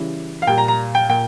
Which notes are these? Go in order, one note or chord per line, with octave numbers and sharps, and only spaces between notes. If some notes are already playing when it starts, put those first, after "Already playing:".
Already playing: C#3 E3 G3
F5
A#2 G3 G5
A#5
A#5
G5
A#2 G5